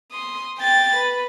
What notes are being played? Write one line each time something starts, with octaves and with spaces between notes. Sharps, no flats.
C6 D#6
G5 A6
B4